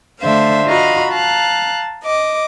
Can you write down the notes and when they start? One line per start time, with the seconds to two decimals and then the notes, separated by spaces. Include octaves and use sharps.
0.21 D3 A3 C5 E5 F5
0.66 F4 F#4 D#5 F5 A#5 B5
1.12 F5 A5 A#5 F#6
2.03 D#5 D6